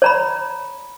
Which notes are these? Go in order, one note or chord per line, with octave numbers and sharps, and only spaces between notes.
C#5 A#5 B5